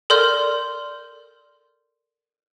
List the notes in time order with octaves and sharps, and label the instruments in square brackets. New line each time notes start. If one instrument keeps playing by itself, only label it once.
[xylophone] A4 A#4 D5 C6 F6 G6